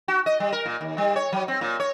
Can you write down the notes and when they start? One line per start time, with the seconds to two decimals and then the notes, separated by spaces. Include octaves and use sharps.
0.08 F#4
0.26 D#5
0.40 G3
0.52 A#4
0.66 A#2
0.81 D#2
0.98 G3
1.16 C#5
1.32 F#3
1.48 C4
1.61 A#2
1.80 C#5